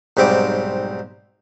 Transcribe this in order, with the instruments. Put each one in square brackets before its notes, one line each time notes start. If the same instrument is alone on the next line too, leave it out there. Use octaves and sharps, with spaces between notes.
[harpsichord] B1 G#2 G3 C4 D6